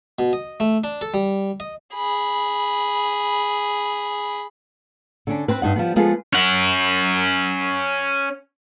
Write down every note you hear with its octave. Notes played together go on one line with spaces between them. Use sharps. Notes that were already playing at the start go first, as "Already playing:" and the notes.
B2
D#5
A3
D4
A4
G3
D#5
G#4 B5
D3 C#4 D4
C4 B4
G2 D#4 F#5
F3 G3 B3
F3 G#3 B3 F4 G#4 A4
C#4 F#5